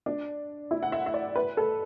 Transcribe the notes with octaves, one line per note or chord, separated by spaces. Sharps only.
D4
E4
F#5
E5
E5
D5
B4
A4